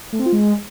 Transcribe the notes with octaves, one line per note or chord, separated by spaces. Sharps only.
A3
C4
F4
G#3